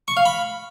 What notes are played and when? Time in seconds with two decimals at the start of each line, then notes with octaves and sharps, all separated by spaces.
0.08 C#6
0.17 F5
0.26 B5